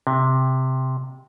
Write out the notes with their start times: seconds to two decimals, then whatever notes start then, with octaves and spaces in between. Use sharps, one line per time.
0.07 C3